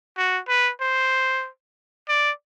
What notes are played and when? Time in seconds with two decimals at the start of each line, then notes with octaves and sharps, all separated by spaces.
0.17 F#4
0.48 B4
0.81 C5
2.08 D5